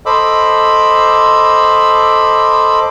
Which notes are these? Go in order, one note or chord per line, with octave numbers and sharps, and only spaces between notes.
A4 C5 D#5 B5 D6 E6